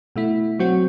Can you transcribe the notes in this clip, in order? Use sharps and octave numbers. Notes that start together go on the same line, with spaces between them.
B2 A3 E4
F#3 C4 F#4